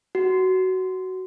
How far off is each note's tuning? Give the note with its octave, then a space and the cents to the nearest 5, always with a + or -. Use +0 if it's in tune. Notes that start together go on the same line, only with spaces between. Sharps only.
F#4 +15